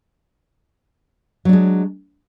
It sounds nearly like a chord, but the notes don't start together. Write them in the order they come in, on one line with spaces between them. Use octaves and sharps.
F#3 D4 G#3